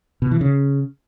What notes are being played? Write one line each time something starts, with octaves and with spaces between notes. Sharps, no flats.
B2
E3
C#3